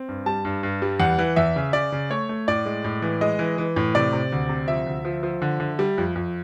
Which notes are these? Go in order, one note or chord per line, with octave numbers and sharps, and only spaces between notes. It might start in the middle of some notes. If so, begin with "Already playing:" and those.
Already playing: C4
G2
G3 A5
G2
G2
G3
E2 F#5
E3
E2 E5
C#3
C#3 D5
C#3
A3 C#5
A3
A2 D5
G#3
A2
E3
G#3 D#5
E3
E3
A2
C3 D5
C3
D2
C3
F3 E5
D2
F3
F3
D3
D3
G3
F2
F2